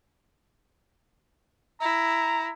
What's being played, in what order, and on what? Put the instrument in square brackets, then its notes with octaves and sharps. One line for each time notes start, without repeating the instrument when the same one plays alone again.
[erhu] E4 [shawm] A#5